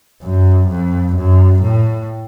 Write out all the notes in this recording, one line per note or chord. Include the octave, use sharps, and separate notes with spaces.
F#2
F2
F#2
A2